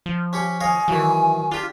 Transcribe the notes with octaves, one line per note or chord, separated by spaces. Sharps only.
F3
C#4 G4 C#5
C#5 D#5 F5 G#5
D#3 E3 F#3
D4 F4 G4